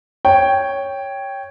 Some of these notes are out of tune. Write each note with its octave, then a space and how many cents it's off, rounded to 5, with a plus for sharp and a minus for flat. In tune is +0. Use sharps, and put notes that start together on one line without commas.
C#5 +0 G5 +0